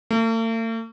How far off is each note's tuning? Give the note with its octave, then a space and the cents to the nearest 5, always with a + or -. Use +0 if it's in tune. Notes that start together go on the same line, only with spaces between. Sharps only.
A3 +45